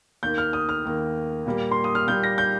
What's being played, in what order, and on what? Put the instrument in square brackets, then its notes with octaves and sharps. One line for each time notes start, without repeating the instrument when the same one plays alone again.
[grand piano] D#2 D#3 A#3 G6
F6
D#6
F6
D#2 D#3 A#3
A#2 G3 A#3
C6
D#6
F6
A#2 G3 A#3 G6
A#6
G6